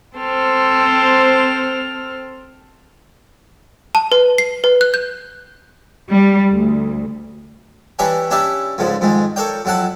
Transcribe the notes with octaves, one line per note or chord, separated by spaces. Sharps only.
C4 A4 C5 F6
A5
B4
C7
B4
F#6
G6
G3
D2
E3 D4 E4 G4 C#5 G#5
C#4 D4 E4 G4 D5 E5
C#2 G#2 D3 F3
F2 G#2 D#3 G#3
A4 A#4 C#5 D5 G5
F2 F#3 E4 F#5 A5